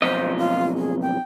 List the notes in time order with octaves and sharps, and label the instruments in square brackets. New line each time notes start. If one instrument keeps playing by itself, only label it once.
[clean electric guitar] B1 F2 D#5 [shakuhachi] C5
[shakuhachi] F4
G#4
G5